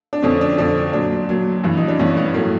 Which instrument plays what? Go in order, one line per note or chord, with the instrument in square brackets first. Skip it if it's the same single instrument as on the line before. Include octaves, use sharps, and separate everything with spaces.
[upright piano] D4
F2 D3 F3 C#4
D4
F2 D3 F3 D4
A#2 F#3 D4
A#2 F#3
G2 E3
D#4
D4
G2 E3 C#4
B3
A2 F#3 A#3